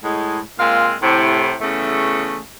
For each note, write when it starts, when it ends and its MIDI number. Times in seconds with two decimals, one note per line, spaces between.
0.03 0.39 45
0.03 0.39 56
0.59 0.94 46
0.59 0.94 56
0.59 0.94 60
0.59 0.94 77
1.02 1.55 45
1.02 1.55 48
1.60 2.39 40
1.60 2.39 49
1.60 2.39 57